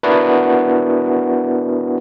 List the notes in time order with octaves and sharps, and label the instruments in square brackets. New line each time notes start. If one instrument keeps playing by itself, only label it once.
[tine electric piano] B3 D4 E4 F#4 A#4 B4